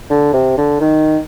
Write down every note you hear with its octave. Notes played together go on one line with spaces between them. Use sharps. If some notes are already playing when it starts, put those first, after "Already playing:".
D3
C3
D3
D#3